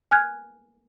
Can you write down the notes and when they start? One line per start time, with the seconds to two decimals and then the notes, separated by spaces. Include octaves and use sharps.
0.11 G#5 F6 F#6 G#6